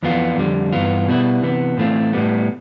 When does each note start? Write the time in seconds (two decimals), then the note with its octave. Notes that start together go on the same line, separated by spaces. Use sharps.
0.03 F2 E3 B3 F4
0.37 F2 D3 G3
0.73 G2 E3 B3 F4
1.08 B2 G3 B3 E4
1.43 C3 E3 B3
1.77 A2 E3 A3 C4 F4
2.13 A2 G3 B3